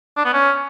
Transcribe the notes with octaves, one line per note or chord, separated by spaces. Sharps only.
D4
B3
C#4